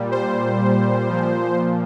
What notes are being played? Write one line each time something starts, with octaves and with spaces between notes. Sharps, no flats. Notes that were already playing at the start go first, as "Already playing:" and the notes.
Already playing: A#2 G3
C5
A#2 F3